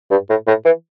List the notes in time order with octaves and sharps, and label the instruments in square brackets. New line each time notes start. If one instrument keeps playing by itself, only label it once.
[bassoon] G2
A2
A2
E3